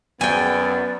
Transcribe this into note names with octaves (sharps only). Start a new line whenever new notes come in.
F#2 B3 D5 G5 G#5